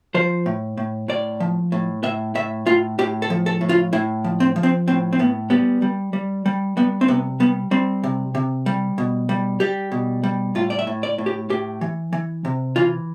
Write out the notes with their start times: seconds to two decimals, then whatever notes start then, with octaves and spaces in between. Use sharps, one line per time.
0.14 F3 C5
0.46 A2
0.77 A2
1.08 A2 D5
1.40 F3
1.72 A2
2.03 A2 E5
2.35 A2 E5
2.67 A2 F4
2.99 A2 G4
3.22 A4
3.30 F3
3.46 A4
3.61 A2
3.69 F4
3.93 A2 E4
4.24 F3
4.40 C4
4.56 F3
4.63 C4
4.88 A2 C4
5.13 C4
5.19 A2 B3
5.50 G3 B3
5.82 G3
6.13 G3
6.46 G3
6.77 G3 B3
7.01 C4
7.08 C3 B3
7.40 G3 B3
7.71 G3 C4
8.04 C3
8.35 C3
8.66 G3
8.98 B2
9.29 G3
9.60 G3 G4
9.92 B2
10.23 G3
10.55 A2 F4
10.70 D5
10.79 E5
10.87 A2
11.03 D5
11.18 A2
11.26 G4
11.50 A2 G4
11.81 E3
12.13 E3
12.45 C3
12.76 E3 F4